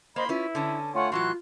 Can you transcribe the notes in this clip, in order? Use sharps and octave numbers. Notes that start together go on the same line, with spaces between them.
A#3 C5 D#5 B5 C6
C#4 E4 F4 B4
D3 C#4 A5
A3 F4 C#5 F#5 G#5 C#6
A2 E3 F#3 F4 F#4 C6 F#6